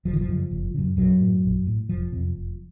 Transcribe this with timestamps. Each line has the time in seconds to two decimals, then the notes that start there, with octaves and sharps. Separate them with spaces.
0.05 F#1 F3
0.13 D#3
0.21 F3
0.28 F#2 C#3
0.51 F#1
0.74 F#2 C#3
0.97 A#1 F#2 F#3
1.20 A2
1.44 A#1
1.67 A2
1.89 F1 F3
2.12 F2 C3
2.35 F1